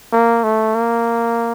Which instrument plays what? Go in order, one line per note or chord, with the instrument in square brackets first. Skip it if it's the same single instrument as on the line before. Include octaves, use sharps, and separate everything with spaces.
[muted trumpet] A#3
A3
A#3